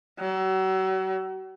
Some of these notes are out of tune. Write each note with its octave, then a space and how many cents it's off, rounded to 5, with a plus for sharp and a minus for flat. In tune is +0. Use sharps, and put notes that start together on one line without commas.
F#3 +40